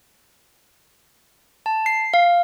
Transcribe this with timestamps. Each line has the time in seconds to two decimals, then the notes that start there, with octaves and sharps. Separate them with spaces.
1.66 A5
1.86 C7
2.14 F5